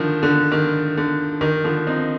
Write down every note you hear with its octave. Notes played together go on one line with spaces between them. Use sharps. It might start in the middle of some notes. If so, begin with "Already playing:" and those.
Already playing: D3 D#3 F3
D3
D#3
D3
D#3
D3 F3
C4 D#4